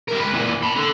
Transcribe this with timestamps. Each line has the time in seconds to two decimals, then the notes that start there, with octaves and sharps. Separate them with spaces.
0.08 G3 A#4
0.20 C#2 B4
0.33 A#2 E3
0.63 A5 B5
0.76 D3